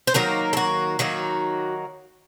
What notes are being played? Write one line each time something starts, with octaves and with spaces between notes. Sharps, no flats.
C5
D#3 F#3 A#3 A#4
A4
F#4
D#3 F#3 A#3 F#4